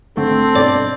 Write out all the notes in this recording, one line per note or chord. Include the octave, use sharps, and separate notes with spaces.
G#1 D3 A3 C4 A4
G2 B2 D4 D5